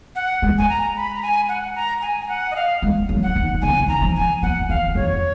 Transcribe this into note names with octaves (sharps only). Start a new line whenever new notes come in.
F#5
G#3
G#5
A#5
B5
A#5
G#5
F#5
A#5
G#5
G#5
F#5
D#5
F5
G#3
F#3
F#5
D#3
C#3 G#5
D#3
A#5
F3
G#5
F3 F#5
D#3 F5
F2 C#5